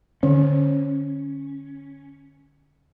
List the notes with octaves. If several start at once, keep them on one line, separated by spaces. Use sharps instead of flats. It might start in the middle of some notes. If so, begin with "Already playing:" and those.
D3 C#4